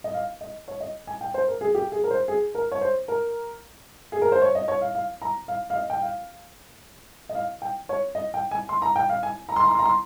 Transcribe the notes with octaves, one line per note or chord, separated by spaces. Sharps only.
D#5
F5
D#5
C#5
D#5
G#5
G5
C5
A#4
G#4
G4
G#4
A#4
C5
G#4
A#4
C#5
C5
A#4
G#4
A#4
C5
C#5
D#5
C#5
F5
F5
A#5
F5
F5
D#5
G5
F5
D#5
F5
G5
C#5
D#5
G5
G#5
C6
A#5
G5
F5
G#5
A#5
C6
A#5
C6
A#5
C6